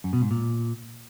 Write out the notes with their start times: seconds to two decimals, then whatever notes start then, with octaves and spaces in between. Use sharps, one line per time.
0.04 F#2
0.13 B2
0.22 G#2
0.31 A#2